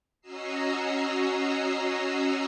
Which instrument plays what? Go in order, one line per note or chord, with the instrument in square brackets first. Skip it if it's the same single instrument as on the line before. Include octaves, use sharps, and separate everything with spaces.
[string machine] C#4 F#4 D#5 A#5 E6 C7